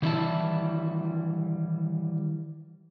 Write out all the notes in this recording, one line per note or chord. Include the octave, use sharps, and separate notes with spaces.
D#3 E3 G3 E4 E5 A5